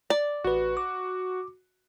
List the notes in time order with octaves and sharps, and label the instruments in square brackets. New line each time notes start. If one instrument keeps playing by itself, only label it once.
[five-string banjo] D5
[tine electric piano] A1 B4 [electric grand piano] F#4
[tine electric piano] D6